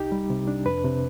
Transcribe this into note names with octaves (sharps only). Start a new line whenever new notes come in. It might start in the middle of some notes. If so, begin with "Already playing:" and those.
Already playing: C2 D#4 G4
G3
C3
D4
F2 B4
C3